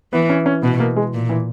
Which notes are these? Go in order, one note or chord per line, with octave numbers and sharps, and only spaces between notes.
E3 B3
C#4
C#4
B2 B3
A#3
G#3
A#2
E3